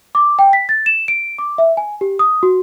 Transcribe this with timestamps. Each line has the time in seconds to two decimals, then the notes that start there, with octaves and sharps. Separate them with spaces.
0.15 D6
0.39 G5
0.53 B6
0.69 A6
0.86 E7
1.08 D7
1.38 D6
1.58 E5
1.77 G#5
2.01 G4
2.19 D#6
2.43 F#4